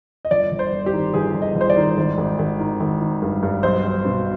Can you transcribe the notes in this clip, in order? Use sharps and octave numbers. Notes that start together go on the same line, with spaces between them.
D#5
G1 D5
G1
C5
G1
G4
D#3
G1 G#4
G1
D#5
G1
C5
D5
D#3
G#1
G#1
G#1
D#3
G#1
D#3
G2
G2
B1 C5
B1
B2